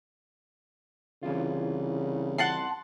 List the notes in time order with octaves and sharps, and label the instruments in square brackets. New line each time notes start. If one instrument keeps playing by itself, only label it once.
[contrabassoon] C2 [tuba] C#3 [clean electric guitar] E3 F4
[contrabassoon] C2 [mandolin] F#5 A5 C6